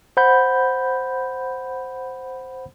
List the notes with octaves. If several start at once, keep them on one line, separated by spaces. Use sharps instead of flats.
C5 F#5 B5 G6